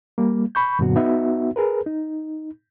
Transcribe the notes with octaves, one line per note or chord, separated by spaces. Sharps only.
G3 A#3
B5 C#6 G6
F#2 A#2 D3 F#3 B3 F#4
B3 D#4 F#4 E5
G#4 A#4 B4
D#4